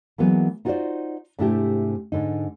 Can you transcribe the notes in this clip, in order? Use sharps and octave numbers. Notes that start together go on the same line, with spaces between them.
E3 F#3 G#3 A#3 B3
D#4 F4 F#4 A4 C5 D5
G#2 C3 A3 D4 E4 G4
G#2 D3 D#4